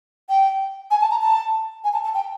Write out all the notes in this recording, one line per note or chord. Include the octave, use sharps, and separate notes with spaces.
G5
G#5
A5
A#5
A5
G#5
A5
A5
G5